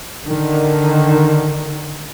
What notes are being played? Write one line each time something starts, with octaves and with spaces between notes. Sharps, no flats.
D3 D#3